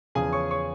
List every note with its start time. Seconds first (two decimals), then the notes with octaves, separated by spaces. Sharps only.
0.15 E2 C#3 F3 G#4 G#5
0.33 C#5 C#6
0.51 C#5 C#6